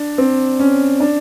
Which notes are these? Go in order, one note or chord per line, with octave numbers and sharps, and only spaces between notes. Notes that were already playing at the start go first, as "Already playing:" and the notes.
Already playing: D4
C4
C#4
D4